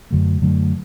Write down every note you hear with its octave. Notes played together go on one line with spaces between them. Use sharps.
F#2 D3 F#3 A3
F#2 D3 F#3 A3